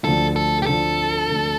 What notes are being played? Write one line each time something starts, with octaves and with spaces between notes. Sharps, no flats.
D2 D3 F3 A4
A4
G4
D2 D3 F3 A4
D2 D3 F3